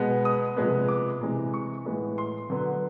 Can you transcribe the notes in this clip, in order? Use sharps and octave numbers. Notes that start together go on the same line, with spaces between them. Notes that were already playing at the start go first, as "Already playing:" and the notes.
Already playing: B2 G#3 B3
D#6
C3 F3 G#3 B3
D6
C3 E3 G#3
C#6
A2 E3 G#3 B3
C6
D3 F#3 B3